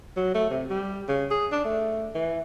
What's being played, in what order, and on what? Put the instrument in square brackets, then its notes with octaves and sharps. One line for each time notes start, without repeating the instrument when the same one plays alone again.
[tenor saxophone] F#3
A3
C3
G3
C#3
G#4
D4
A3
E3